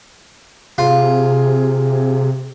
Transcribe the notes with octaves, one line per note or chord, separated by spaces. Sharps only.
C3 F4 G#4